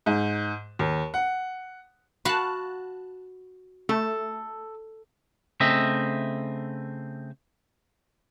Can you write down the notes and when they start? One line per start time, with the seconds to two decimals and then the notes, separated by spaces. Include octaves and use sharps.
0.06 G#2
0.79 D#2
1.14 F#5
2.25 F#4 F5 A5 B5 F#6
3.89 A3 A4
5.60 C#3 A3 C4 D#5 E5